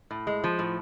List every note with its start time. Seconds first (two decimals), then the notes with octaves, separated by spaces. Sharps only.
0.11 A2
0.27 G#3
0.44 F3
0.59 A2